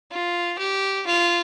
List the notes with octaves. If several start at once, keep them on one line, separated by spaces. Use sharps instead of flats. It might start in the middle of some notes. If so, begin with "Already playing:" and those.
F4
G4
F4